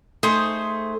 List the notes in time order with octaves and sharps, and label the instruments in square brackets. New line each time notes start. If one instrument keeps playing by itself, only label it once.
[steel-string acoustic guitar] A3 [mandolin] D#4 G#4 C5